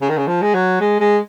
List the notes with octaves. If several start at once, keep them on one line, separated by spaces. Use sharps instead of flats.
C#3
D#3
C#3
F3
G#3
F#3
G#3
G#3